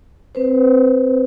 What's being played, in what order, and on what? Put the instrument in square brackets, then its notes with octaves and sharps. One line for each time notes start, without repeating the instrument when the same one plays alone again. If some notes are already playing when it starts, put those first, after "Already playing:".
[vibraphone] C4 B4 C5